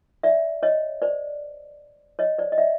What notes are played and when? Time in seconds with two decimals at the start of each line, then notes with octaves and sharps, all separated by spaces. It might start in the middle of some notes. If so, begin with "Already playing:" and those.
0.23 D5 E5
0.63 C#5 D#5
1.02 C5 D5
2.19 C#5 D#5
2.38 C5 D5
2.52 D#5
2.58 D5 E5